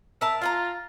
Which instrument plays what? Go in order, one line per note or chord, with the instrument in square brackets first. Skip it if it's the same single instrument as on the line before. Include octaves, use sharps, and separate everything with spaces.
[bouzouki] A#4 A5 [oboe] E5
[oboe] F4 [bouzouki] F5 F#5 A#5